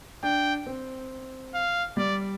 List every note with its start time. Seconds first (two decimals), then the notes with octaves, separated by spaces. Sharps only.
0.23 D4 G5
0.67 C4
1.54 F5
1.97 G3 D5